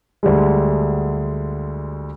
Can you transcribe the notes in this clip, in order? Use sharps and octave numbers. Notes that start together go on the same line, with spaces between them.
D2 D3 G3 G#3